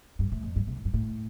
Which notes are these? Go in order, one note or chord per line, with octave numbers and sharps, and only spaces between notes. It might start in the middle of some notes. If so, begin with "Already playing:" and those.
G2
A2
F2
G2
C3
A2
G2
A2